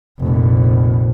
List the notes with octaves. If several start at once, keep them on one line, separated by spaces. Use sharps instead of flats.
F1 A#1